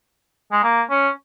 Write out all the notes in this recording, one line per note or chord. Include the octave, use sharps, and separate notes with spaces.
G#3
A#3
C#4